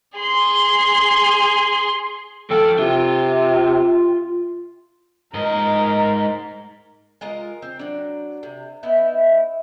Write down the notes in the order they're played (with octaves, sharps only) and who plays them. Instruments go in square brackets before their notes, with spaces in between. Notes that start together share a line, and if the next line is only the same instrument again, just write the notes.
[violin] G#4 C6
[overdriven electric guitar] F3 G5 [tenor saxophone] A4
[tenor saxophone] C3 [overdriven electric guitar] F4
[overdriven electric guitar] G#2 D#5 [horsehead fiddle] A#4
[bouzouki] G#3 F4 A#4 D#5
C4
F#3 D4
C3
B3 D#4 E4 E5